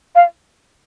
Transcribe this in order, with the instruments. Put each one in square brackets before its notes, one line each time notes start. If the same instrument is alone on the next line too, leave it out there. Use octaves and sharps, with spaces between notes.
[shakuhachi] F5